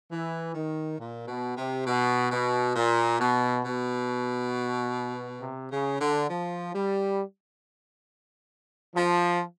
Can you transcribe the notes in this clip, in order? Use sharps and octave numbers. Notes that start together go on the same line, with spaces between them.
E3
D#3
A#2
B2
C3
B2
B2
A#2
B2
B2
C3
C#3
D3
F3
G3
F3